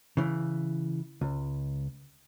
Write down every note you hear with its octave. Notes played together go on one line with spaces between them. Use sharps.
C#3 E3
C#2